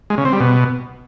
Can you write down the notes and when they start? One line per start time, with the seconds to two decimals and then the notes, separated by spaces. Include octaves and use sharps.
0.10 G#3
0.18 C#3
0.25 C4
0.33 G3
0.40 B2